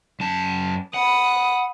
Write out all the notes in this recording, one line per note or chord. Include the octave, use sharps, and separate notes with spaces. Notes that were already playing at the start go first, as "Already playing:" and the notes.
F#2 A5
F#5 B5 D#6